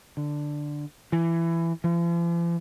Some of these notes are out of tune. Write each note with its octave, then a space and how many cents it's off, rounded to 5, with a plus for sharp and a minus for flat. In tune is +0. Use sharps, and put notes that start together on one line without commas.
D3 +5
E3 +15
F3 -45